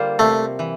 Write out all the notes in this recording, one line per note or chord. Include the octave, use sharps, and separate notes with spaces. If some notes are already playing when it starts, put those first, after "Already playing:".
Already playing: D3 G3 A#3 F4 C5
C3 A3
E3